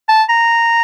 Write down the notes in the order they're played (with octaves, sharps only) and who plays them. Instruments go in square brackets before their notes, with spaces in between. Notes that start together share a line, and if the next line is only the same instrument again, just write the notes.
[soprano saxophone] A5
A#5